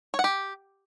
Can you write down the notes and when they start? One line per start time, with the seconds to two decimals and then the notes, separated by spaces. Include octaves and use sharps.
0.14 C#5
0.19 F#5
0.24 G4